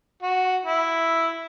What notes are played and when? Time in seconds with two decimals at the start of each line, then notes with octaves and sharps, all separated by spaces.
0.22 F#4
0.65 E4